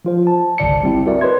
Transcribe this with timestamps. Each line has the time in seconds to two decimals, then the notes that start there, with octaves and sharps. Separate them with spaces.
0.05 F3 F4 C5
0.27 A5
0.58 G1 C2 C#3 D5 A5 C#7
0.83 G3 C4 E4
1.06 F#4 A#4 D5 E5
1.21 B4 C#5 D#5 C6 G#6